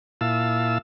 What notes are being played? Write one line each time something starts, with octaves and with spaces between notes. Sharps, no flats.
A#2 E4 F5 A5 E6